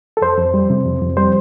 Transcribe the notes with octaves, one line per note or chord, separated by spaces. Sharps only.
A4
F2 C5
F2
G3
C3
F2
F2
G3 C5